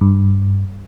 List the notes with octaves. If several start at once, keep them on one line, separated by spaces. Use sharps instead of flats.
G2